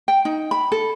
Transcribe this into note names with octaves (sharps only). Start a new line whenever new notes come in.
G5
D#4
B5
A4